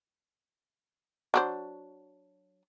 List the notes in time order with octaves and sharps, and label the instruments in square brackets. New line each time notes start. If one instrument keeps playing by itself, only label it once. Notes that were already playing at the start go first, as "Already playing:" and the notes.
[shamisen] F#3 D4 C5